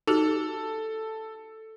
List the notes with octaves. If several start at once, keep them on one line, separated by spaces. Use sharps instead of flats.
D#4 F#4 G4 A4